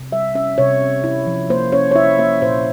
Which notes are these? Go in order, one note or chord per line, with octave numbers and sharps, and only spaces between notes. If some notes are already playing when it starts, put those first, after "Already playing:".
Already playing: C3
G3 E5
C#4 E5
C3 C#5
C#4
E4
F3
A#3 C5
C#4 C#5
C#5
E4 E5
A#3 E5
A#2 C5